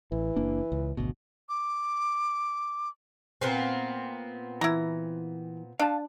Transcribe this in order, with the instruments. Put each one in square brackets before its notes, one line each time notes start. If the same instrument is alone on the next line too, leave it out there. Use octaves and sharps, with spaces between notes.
[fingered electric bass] A1 [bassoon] E3
[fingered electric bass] F#1 A#3 D4
C#2
G#1 D2 B2
[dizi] D6
[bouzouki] A#2 B3 C4
[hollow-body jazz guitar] E3 [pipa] E4 A#5
[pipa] D4 [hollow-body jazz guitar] F5 A5